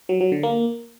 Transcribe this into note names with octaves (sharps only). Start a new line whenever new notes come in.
F#3
F#3
D3
A#3